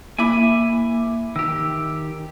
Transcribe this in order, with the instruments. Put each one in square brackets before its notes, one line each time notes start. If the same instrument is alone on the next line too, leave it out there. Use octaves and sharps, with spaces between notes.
[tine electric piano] A#3 [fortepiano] E4 B5 D6 [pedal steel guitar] G#5
[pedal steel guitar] D#3 G4 [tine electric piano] E6